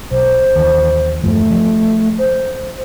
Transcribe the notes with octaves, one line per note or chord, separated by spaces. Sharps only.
B1 C5
D#2 E3
E2 G2 F3 A3
F3
C5